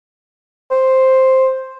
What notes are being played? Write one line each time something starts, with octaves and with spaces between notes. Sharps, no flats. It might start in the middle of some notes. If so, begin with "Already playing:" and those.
C5